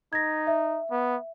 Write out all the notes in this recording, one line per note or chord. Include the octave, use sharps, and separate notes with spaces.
D#4 G#6 A#6
E5
B3